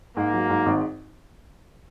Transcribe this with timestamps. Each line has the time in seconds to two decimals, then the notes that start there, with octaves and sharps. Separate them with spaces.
0.16 G#2 A#3
0.33 F#3
0.50 G#2
0.66 G#1